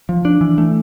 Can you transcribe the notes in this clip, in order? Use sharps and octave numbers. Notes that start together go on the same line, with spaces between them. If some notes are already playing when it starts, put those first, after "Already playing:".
F3
D4
E3
A3